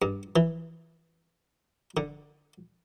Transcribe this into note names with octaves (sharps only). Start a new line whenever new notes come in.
G2
E3
D3